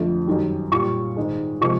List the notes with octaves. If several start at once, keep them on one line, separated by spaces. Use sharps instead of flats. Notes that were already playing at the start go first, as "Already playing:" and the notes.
Already playing: F2 D3 F3 A3
F#2 D#3 G3
A#2 G3 C#6
G#2 D#3 G#3
C3 F3 G#3 C#6